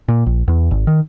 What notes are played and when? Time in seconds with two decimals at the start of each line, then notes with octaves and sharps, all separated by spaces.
0.08 A#2
0.26 A#1
0.48 E2
0.71 G#1
0.87 D#3